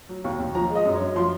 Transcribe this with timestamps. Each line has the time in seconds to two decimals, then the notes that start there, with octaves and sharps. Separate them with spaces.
0.09 F#3
0.24 D#2 C#6
0.40 D#2
0.55 F3 A#5
0.70 G#3
0.75 D#5
0.85 F#2
0.96 C#5
1.00 F#2
1.16 F3 C6